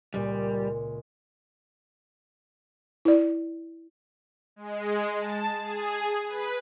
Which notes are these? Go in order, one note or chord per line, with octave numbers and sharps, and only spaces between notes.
C#2 A#2 G3
E4 D5
G#3
A5
G#4
B4